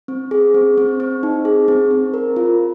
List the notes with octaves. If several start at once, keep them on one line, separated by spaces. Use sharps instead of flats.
C4
G#4
C4
C4
C4
D#4
G#4
C4
C4
A#4
F4